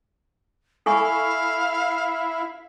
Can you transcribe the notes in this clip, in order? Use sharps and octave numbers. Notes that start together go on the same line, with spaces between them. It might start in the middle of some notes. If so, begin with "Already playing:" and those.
E4 A4 F5 G#5 C#6